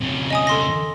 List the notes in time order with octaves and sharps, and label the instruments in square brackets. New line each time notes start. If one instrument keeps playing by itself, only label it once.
[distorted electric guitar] F2 C#3
[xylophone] D#5 G#5 D#6
A4 C6 A#6